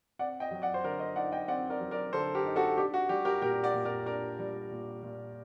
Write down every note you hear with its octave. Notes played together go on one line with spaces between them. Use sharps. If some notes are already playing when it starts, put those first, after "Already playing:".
C4 D5 F#5
D#5 G5
F#3
D5 F#5
C5
D3 A#4 D5
C5 D#5
D#4 D5 F#5
D#5 G5
C4 D5 F#5
A#4 D5
F#3
A#4 D5
D3 A4 C5
G4 A#4
D#4
F#4 A4
D4 G4
F#4
G3 G4
G4 A#4
A#2 G4 A#4
D5 F#5
A#2
A#4 D5
D4 A#4 D5
G3
A#2
A#2